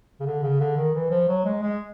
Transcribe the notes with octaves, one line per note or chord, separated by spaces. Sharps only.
C#3
D3
C#3
D3
D#3
E3
F3
F#3
G#3
G#3